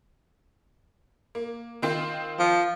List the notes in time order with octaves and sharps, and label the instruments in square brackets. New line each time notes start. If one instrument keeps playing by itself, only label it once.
[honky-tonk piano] A#3
D#3 C4 F4
[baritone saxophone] F3